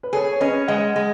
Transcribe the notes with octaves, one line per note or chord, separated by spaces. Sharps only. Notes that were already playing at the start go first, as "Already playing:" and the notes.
B4
G#4 A4 C#5
C#5
C#4 B4 D#5
G#3 D#5 F#5
G#3